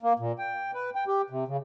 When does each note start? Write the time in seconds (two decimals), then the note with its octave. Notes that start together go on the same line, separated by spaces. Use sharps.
0.03 A#3
0.19 A#2
0.38 G5
0.74 B4
0.95 G5
1.07 G4
1.30 C3
1.48 C#3